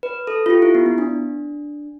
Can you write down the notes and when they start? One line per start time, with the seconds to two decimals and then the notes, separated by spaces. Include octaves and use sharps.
0.03 B4
0.27 A4
0.46 F4
0.50 G4
0.62 E4
0.75 B3
0.86 B3
0.98 D4